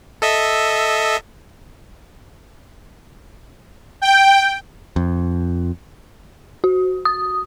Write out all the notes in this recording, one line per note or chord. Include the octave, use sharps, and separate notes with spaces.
A4 D#5 E5
G5
F2
F#4
D#6